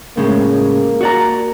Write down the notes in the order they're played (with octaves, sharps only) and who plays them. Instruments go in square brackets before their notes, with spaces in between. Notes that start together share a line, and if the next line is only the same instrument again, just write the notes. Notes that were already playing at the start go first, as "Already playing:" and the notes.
[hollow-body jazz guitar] A2 C#3 G#3 [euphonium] A#3
[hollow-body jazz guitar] F#4 D5 A#5